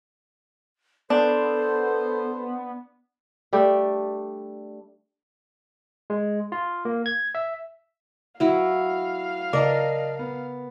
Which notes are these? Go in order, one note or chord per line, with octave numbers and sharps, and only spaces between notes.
B3 D4 A4 C5
G3 A3 D4 G4
G#3
F4
A#3
G#6
E5
F#3 E4 F#4 F5
C#3 A#4 D5 D#5 A5
B3